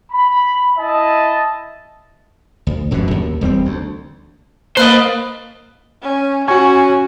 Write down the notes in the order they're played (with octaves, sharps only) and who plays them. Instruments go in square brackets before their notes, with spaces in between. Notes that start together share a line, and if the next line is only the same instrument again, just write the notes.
[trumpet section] B5
E4 D#5 A5
[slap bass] D2
E1 F#2 B2 D3
D#2
E1 G3 A3 C4
D2
[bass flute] A#3 [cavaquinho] B4 F5 [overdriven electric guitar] C5 D#5
[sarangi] C#4
[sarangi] C#4 [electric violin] F#4 [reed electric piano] G#5 C#6